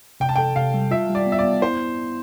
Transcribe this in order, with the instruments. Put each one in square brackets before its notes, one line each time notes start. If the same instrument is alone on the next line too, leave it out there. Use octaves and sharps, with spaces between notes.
[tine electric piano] C3 [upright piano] G5
[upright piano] A5
[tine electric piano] A4 [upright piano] G5
[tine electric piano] C3 [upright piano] F5
[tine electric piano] G3
[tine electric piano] F4 [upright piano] E5
[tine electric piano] G3
[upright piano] D5
[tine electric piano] B3
[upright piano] E5
[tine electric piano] B3 [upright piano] D5
[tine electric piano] E4 [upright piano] C5